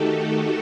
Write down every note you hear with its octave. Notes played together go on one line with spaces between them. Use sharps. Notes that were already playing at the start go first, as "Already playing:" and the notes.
Already playing: D#3 A3 D#4 F#4 G4 A4